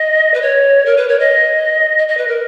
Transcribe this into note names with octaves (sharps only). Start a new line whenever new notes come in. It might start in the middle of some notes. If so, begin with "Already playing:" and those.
Already playing: D#5
B4
C#5
A#4
B4
C#5
D#5
D#5
D#5
B4
A#4